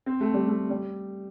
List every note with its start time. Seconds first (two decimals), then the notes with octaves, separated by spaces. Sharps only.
0.06 C4
0.21 A3
0.34 G3
0.48 A3
0.70 G3